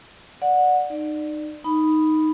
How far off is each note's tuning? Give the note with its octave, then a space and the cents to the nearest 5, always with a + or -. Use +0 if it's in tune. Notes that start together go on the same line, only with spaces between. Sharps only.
D5 +5 F#5 -15
D#4 -25 D5 +15
D#4 +0 B5 +0